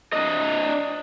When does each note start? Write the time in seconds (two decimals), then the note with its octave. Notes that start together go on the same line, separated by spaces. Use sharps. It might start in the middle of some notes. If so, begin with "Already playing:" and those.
0.13 D4 D#5